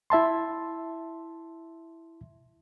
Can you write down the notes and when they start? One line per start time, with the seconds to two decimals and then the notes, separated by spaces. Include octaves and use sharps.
0.10 E4 E5 A5 C6